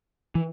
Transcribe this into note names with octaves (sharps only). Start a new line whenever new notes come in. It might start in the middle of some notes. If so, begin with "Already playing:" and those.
E3